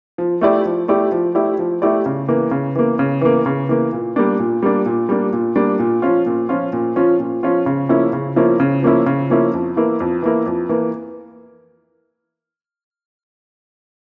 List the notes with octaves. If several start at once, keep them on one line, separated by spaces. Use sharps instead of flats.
F3
A3 E4 G4 D5
F3
A3 E4 G4 D5
F3
A3 E4 G4 D5
F3
A3 E4 G4 D5
C#3
E3 A#3
C#3
E3 A#3
C#3
E3 A#3
C#3
E3 A#3
A#2
G3 A#3 D4
A#2
G3 A#3 D4
A#2
G3 A#3 D4
A#2
G3 A#3 D4
A#2
F3 C#4 F4
A#2
F3 C#4 F4
A#2
F3 C#4 F4
A#2
F3 C#4 F4
C#3
F3 A#3 C#4 E4
C#3
F3 A#3 C#4 E4
C#3
F3 A#3 C#4 E4
C#3
F3 A#3 C#4 E4
F2
E3 A#3 E4
F2
E3 A#3 E4
F2
E3 A#3